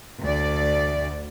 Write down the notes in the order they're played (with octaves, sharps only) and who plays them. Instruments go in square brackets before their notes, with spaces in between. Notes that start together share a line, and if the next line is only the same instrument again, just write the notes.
[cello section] D2 D5